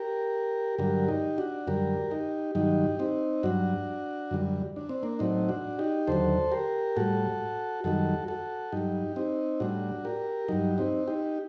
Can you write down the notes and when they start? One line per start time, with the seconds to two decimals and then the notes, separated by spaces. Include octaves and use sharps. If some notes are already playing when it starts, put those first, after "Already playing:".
Already playing: G4 A#4
0.78 G2 D3 F#3 G4 A#4
1.08 D#4 G4
1.38 D4 F#4
1.67 F#2 D3 G3 G4 A#4
2.11 D#4 G4
2.55 G2 D#3 F#3 D#4 G4
2.99 C4 D#4
3.43 G2 F#3 D4 F#4
4.31 F#2 D3 G3
4.76 D4
4.89 C4
5.03 A#3 D4
5.19 A2 F#3 C4 D#4
5.49 D4 F#4
5.78 D#4 G4
6.07 D#2 D3 F#3 A4 C5
6.51 G4 A#4
6.96 A2 G3 F#4 A4
7.84 F#2 D#3 G3 F#4 A4
8.28 F#4 A4
8.72 G2 F#3 D#4 G4
9.16 C4 D#4
9.60 A2 G3 D4 F#4
10.05 G4 A#4
10.48 G2 F#3 D#4 G4
10.78 C4 D#4
11.08 D#4 G4